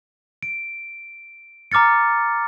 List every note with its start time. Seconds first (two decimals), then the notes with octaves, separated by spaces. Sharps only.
0.43 D7
1.72 A#5 D6 F6 A6 C#7